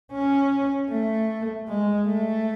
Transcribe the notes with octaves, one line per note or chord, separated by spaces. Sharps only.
C#4
A3
G#3
A3